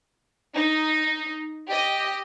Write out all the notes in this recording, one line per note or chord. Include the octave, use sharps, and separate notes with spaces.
D#4
G4 D#5